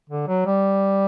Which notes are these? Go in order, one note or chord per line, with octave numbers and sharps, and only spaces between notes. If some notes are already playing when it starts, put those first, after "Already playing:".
D3
F#3
G3